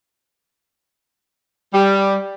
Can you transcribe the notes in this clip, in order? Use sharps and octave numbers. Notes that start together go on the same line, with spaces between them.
G3